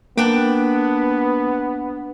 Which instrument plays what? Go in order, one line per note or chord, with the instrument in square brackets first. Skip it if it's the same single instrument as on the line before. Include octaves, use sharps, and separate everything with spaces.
[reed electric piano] A#3 [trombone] B3 [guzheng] D4 G5